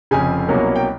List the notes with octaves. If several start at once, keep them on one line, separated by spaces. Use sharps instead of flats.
F1 F2 C#3 G#5
C2 B2 F#3 A#3 C#4
G5